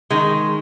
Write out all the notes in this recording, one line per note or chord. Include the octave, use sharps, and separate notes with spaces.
D#3 G#3